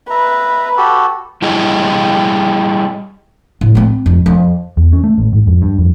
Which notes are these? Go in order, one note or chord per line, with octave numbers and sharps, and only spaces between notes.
B4 E5 A#5
F#4 G4 A4
G3 E4 G4 G#4 D#5
A2
G#3 C4
F2
F2
E2
C#4
A3
A1
G#2
F2
G2
F2